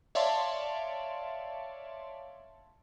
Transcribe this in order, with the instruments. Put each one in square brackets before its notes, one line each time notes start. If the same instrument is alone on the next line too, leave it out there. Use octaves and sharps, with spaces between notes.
[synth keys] C#5 D5 E5 F5 A5 C6